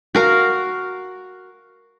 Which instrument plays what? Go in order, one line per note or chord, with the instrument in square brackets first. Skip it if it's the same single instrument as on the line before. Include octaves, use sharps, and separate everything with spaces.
[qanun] F#4 A#4 F5